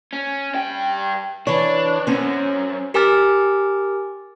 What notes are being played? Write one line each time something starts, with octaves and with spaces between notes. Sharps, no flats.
C#4
G2 G5
E3 D4 C#5
F#2 C4 C#4
G4 A#4 G#5 D6 F6 A6